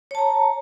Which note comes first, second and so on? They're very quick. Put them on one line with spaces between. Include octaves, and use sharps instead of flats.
C#5 A5 A#5